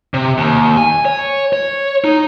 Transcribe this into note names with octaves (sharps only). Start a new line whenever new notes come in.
C3
D#2
G#5
C#5
C#5
D#4